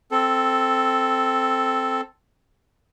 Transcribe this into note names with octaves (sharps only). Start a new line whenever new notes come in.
C4 A4